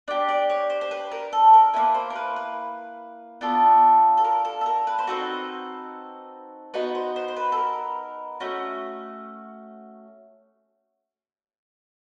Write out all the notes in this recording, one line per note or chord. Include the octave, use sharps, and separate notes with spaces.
D4 G4 D5
D5
C#5
C5
C5
B4
A#4
A4
A#4
A#3 C#4 E4 B4
C5
A#4
B4
B4
B3 D4 F4 A4
A4
A#4
A4
A4
A#4
B4
C5
C4 D#4 F#4 A4 B4
B3 D#4 F#4 B4
C5
C5
C5
B4
A4
A#4
A3 C#4 F#4